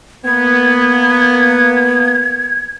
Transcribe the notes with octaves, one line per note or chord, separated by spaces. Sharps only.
A#3 B3 G#6